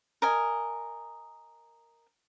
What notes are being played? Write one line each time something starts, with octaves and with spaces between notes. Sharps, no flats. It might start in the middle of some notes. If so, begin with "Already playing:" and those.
A#4 D#5 G#5